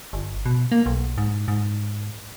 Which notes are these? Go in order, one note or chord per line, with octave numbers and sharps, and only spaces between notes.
G1
B2
A#3
B1
G#2
G#2